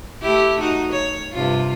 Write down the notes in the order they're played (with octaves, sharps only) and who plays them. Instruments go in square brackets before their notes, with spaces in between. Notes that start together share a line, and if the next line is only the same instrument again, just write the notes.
[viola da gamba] A3 E4 G4
D#4 F#4
C#5
G2 C3 F4